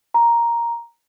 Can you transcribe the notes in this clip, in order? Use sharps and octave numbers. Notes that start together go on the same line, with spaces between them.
A#5